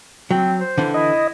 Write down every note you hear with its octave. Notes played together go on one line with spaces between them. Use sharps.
F#3 C4
C5
D3 E3
E4 D#5